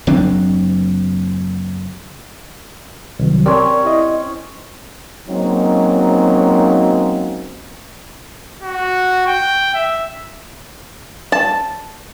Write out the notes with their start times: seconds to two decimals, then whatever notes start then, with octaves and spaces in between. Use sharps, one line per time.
0.07 F#1 F#3 C4 D4
3.19 C2 D#3 F#3
3.46 C4 C#4 G4 A#4 D5
3.85 E4 D#5
5.29 F#3 G#3 A#3 C4 C#4 D#4
8.63 F#4
9.27 G5
9.75 E5
11.32 A5